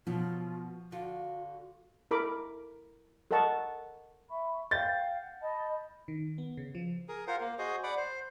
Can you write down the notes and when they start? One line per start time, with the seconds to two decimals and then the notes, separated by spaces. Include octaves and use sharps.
0.07 B2 F3 F#3 F4
0.92 D3 F4 F#4
2.11 E4 A4 A#4 B5 D6
3.31 A4 A#4 D#5 F#5 A5 C#6
4.28 E5 B5 C#6
4.71 F5 G5 G6 A6
5.21 F#5
5.40 D#5 A5 B5
6.08 D#3
6.38 B3
6.57 C#3
6.75 F3
7.09 G#4 A#4
7.27 F4 A#4 C5 F#5
7.41 A#3
7.59 F#4 G#4 C5 D#5
7.83 D5 F#5 B5 D6
7.97 C5